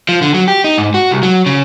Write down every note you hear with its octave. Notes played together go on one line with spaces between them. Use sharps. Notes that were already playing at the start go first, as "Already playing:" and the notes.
F3
D3
F#3
G4
D#4
G#2
F#4
C2
F#3
C#3